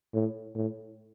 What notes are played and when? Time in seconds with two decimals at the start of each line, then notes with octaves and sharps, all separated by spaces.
0.14 A2
0.55 A2